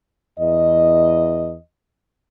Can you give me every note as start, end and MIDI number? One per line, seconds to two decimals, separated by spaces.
0.39 1.55 40
0.39 1.55 75